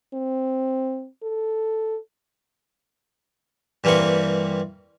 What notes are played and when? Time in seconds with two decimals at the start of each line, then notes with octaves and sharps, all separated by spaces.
0.14 C4
1.23 A4
3.84 G2 E3 G3 A#3 C4 C#6